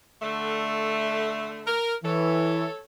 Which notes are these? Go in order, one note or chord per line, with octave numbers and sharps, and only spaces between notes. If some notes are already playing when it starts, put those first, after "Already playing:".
D3 A3
A#4
E3 A4 C#5